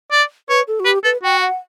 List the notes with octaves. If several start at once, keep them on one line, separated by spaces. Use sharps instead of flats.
D5
B4 C#5
A4
F#4
G4 B4
A4 B4
F#4 G5
F#5